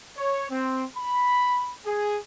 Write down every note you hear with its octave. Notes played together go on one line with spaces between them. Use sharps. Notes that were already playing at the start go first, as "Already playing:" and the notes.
C#5
C4
B5
G#4